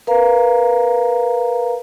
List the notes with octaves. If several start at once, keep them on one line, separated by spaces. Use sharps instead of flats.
A#4 B4 F5 A#5